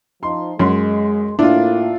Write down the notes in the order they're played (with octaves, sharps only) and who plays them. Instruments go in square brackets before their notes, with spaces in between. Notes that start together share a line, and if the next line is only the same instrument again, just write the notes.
[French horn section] F3 D#4 [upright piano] C6
[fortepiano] F#2 [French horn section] G#3 [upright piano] C6
[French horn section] A2 A#3 [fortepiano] D4 [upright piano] E4 F4